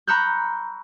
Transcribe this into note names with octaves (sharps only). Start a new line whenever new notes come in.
A#5 B5 C#6 E6 F#6 G6